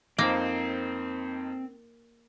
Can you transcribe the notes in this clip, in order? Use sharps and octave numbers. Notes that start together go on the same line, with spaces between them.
F2 A#3 C4 D#4 C5